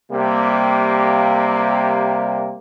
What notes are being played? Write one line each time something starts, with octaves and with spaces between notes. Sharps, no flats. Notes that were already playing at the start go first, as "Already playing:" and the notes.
C3 G3 A#3